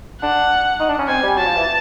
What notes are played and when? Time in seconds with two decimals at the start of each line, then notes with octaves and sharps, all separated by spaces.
0.22 D4 F#5
0.79 D#4
0.89 D4
0.98 C#4
1.08 C4 G#5
1.23 G3
1.37 F#3 A5
1.47 F3
1.56 E3